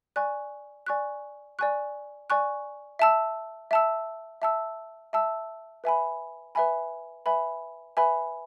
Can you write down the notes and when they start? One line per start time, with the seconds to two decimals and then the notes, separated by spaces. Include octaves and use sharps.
0.16 D5 G#5 C#6 F#6
0.86 D5 G#5 C#6 F#6
1.59 D5 G#5 C#6 F#6
2.30 D5 G#5 C#6 F#6
2.99 E5 A5 E6
3.71 E5 A5 E6
4.42 E5 A5 E6
5.13 E5 A5 E6
5.84 B4 E5 G#5 B5
6.55 B4 E5 G#5 B5
7.26 B4 E5 G#5 B5
7.97 B4 E5 G#5 B5